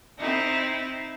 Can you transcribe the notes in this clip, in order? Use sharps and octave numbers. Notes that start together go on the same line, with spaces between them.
C4 D#4 E4